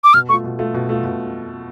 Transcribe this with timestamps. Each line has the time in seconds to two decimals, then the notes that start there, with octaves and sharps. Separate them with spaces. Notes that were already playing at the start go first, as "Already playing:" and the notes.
0.04 D6
0.14 B2 F6
0.29 A3 F4 C#6
0.44 B2
0.59 A3 F4
0.74 B2
0.89 A3 F4
1.04 B2